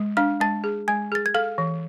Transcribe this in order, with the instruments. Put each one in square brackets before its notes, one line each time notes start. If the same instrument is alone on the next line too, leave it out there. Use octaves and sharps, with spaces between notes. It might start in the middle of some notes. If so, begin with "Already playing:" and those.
Already playing: [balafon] G#3
[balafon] D4 [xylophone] F5 F6
[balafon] G#3 [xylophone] A5 A6
[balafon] G#4
[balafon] G#3 [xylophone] G#5 G#6
[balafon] G#4 [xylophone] A6
[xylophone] G#6
[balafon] A4 [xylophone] F5 F6
[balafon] E3